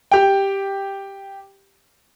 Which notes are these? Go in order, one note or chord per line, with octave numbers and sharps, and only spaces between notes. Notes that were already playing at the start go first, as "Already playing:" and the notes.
G4 G5